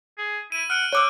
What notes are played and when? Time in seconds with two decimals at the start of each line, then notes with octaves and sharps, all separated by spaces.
0.18 G#4
0.52 E4 D#7
0.70 F#5 F6 D7
0.93 C#5 F#5 D6 E6